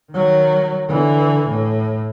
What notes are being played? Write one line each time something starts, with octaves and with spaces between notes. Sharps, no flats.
D#3 F#3
D3 E3
A2